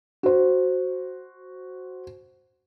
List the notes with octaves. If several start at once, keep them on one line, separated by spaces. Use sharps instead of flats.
F#4 C5